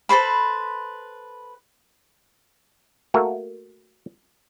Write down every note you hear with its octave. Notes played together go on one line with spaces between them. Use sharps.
A4 B4 C5 B5
A3 A#3 F#4 A#4